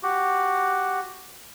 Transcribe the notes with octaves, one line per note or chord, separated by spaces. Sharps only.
F#4 G4